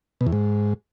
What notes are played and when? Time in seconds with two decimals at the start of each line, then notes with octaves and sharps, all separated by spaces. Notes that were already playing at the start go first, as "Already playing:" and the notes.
0.21 B2
0.27 E2
0.32 G#2